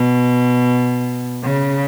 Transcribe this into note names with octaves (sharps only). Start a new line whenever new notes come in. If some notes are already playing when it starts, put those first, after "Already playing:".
Already playing: B2
C#3